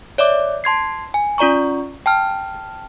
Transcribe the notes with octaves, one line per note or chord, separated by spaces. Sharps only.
C#5 D5 E5 D6
A5 C6 G#6 C7
G#5
C#4 F4 D5 A#5 C#6
G5 A5 F6